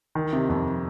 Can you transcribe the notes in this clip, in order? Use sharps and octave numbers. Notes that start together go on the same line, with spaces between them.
D#3
C3
F2